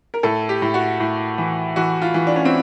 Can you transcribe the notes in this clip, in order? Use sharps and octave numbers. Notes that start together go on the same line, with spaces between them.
A#4
A2 A4
G4
A2
F#4
A2
E3
E3 F#4
F4
E3
D4
C#4
C4